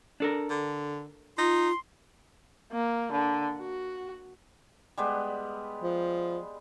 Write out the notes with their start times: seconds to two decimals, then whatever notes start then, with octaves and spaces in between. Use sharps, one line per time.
0.20 D4 A4 A#4
0.50 D3
1.38 D#4 F4 C6
2.72 A#3
3.12 D3
3.58 F#4
4.98 G3 G#3 B3
5.83 F3